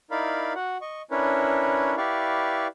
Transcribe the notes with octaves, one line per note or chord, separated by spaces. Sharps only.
D#4 E4 A#4 D5 F5 B5
F#4 F#5
D#5 C#6
C#4 D4 E4 A#4 B4 C#5
E4 G4 B4 D5 F5 C#6